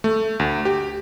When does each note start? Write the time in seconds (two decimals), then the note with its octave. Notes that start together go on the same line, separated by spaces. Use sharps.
0.04 A3
0.40 D2
0.65 G4